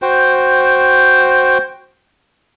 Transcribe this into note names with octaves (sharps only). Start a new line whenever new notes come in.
F#4 C5 G5